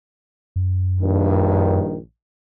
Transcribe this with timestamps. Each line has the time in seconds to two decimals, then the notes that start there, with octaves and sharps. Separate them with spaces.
0.56 F#2
1.01 A#1 G2 D#3